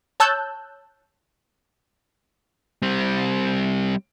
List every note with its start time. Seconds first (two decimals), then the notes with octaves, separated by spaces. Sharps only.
0.20 C#5 A5 E6 F#6 G6
2.82 G3 C4